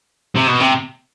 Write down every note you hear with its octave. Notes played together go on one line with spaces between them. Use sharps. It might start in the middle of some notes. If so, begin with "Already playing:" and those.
C3
B2
C3